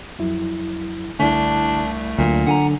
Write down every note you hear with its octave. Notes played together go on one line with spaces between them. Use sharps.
F2 F#3 E4
C2 D3 A3 D4 E4
D2 A#2 F#3
D3 F#5 G#5 A#5